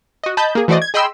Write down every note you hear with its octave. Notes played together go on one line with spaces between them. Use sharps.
F#4 D#5
D#5 A5 B5 G6
A#3 G#4
E3 A3 F#4 C5 D5 D#5
G#6
G#4 D#5 G5 B5 C6 E6